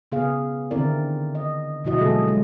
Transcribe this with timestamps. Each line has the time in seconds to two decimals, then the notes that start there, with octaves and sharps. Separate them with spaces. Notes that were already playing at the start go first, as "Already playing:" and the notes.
0.12 C#3 B3 G#4 F5
0.71 D3 D#3 C4 E4 A#4 D5
1.35 D#5
1.84 B2 D3 F3 E4 F#4 D#5
1.98 D3 F#3 G#3 A#3 G#4 A4
2.28 G#3